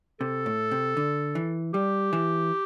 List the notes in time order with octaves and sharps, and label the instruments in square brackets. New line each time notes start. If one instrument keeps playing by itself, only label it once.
[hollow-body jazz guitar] C3 [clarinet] A4
[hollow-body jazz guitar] A2
C3
D3
E3
[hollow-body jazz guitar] G3 [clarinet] G4
[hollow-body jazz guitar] E3